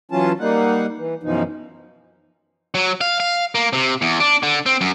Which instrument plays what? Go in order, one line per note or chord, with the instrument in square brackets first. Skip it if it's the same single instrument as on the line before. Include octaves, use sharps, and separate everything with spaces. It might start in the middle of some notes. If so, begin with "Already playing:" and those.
[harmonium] E3 F#3 C#4 F4 A5
G3 A#3 D#4 F#5
E3
F#2 B2 E3 F3 D#4
[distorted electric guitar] F#3
F5
F5
A#3
C3
E2
D4
D3
C4
F#2